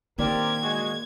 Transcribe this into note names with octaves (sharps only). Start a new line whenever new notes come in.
D#3 A#3 C4 G4 A#4 D5 G#6
G#3 F#4 G#4